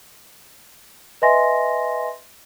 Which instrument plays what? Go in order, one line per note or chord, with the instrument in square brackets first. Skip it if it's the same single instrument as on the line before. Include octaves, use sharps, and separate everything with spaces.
[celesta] B4 D#5 E5 G#5 C6 A#6